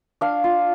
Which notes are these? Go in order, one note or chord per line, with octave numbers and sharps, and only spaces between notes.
D4 F5
F4